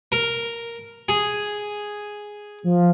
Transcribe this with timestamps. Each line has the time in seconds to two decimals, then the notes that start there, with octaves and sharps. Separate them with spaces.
0.12 A#4
1.09 G#4
2.64 F3